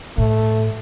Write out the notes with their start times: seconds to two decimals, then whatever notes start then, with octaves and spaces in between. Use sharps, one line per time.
0.17 A2 A3